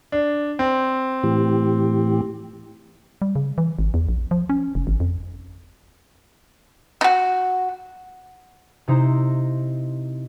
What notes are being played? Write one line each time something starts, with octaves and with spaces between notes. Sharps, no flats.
D4
C4
A2 E3 G4
G3
C#3
E3
G#1
E2
A#1
F3
C#4
F1
G#1
F2
D#4 F#4
C3 D#4 E4 C5 A#5